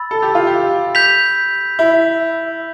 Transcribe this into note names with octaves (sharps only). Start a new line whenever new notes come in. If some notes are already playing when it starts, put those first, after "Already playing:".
Already playing: B5 E6 A6
A4
G4
F4
G4
G6 B6 F7
E4